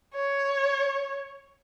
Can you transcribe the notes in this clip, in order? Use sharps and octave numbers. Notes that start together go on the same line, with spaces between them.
C#5